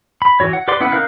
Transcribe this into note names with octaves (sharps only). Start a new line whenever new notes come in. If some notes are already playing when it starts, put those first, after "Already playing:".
B5
E3 F#4 C#5
F#5
G4 B4 D5 C6 D6
B3 C#4 E4 B4 F#5
C#4 D#4 A#4 F5 F#6